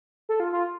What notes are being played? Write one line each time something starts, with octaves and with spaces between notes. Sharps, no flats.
A4
F4
F4